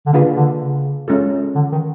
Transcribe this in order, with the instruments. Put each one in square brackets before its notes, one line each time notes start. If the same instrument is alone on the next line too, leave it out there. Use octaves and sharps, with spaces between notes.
[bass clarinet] D3
[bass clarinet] C#3 [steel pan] A#3 D4 F4 G#4 B4
[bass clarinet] D3
C#3
[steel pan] G#3 C#4 F4 A4
[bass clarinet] D3
D#3